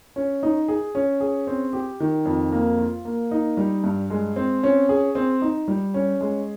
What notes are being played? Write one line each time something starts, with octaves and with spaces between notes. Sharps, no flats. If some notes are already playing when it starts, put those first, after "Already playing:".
C#4
D#4
G#4
C#4
G#4
C4
G4
D#3
F2
A#3
F4
A#3
D#4
G3
G2
G#3
C4
C#4
G#4
C4
D#4
G3
C#4
G#3